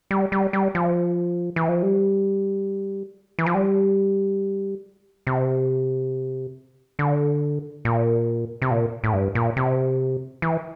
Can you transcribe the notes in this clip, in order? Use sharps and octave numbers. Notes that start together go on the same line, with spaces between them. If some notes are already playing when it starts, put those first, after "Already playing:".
G3
G3
G3
F3
E3
F3
G3
E3
F3
G3
C3
D3
A#2
C3
A#2
A2
G2
A#2
C3
E3